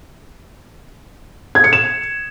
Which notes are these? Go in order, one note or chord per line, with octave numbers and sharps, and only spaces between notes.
G#6
C#7
E7